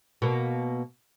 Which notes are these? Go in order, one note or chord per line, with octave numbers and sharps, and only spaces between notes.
B2 A#3